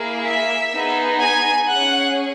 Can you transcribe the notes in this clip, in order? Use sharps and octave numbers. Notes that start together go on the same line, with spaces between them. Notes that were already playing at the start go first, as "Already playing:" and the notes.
Already playing: A#3 E4 G#4
E5
B3 D#4 G#4
G#5
C#4 G#4 F#5